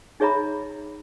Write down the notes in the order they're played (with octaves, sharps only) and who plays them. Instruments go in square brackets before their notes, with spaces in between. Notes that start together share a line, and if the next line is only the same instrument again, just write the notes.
[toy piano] D#4 G#4 C#5 E5 A#5 B5